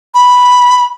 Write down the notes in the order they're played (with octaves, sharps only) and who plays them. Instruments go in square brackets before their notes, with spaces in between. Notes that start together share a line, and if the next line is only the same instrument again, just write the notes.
[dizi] B5